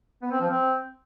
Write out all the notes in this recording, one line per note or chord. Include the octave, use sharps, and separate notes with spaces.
B3
C4
F3
C4